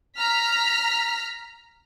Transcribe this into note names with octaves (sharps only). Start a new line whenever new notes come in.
A#5 F6 B6